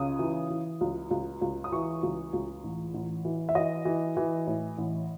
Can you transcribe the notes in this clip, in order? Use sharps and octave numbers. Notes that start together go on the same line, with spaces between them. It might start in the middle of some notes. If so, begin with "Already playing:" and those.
Already playing: C#2 C#3 D#6
E3
E3
C#2
C#2
C#2
D#6
E3 C#6
C#2
C#2
A1
A1
E3
E5
E3 D#5
E3
E3
A2
A1